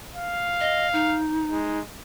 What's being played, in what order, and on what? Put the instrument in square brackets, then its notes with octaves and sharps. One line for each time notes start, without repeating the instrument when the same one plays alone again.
[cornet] F5
[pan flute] D#5
D#4
[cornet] G#3